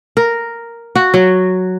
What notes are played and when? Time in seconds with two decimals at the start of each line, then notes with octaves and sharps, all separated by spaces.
0.17 A#4
0.95 F#4
1.14 F#3